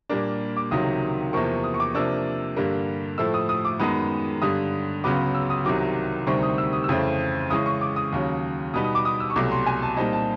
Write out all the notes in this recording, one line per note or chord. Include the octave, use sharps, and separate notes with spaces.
A#2 G3 A#3 D4
D6
C#2 C3 D#3 F#3 D#6
E2 C3 F3 A#3 C#6
D#6
C#6
D6
C3 F3 A#3 D4 E6
G2 D3 G3 A#3
A2 F3 A3 E6
D#6
D#6
D6
F#2 D#3 G#3 B3 D#6
G2 D3 G3 D#6
C#2 C#3 F#3 B3 D6
E6
D#6
C2 C3 D#3 F#3 D6
D2 C3 D#3 G3 C4 C#6
D#6
E6
D#6
E6
F2 C#3 E3 A3 C4 D#6
C#3 E3 G#3 C#4 D#6
C#6
D6
D#6
D#2 C#3 F#3
B2 G3 B3 D#4 D#6
D#6
D6
D#6
E6
C#6
C2 B2 F#3 A3 D6
C6
G#5
A5
A#2 G3 C4 D#4 A5
A5